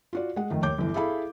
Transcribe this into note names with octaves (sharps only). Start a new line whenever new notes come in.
F4 F#4 D5
G#3 F#5
F2 D#3 A3
D#2 C#5 D6 G6
G1 E3
E4 G#4 A4 F5 B5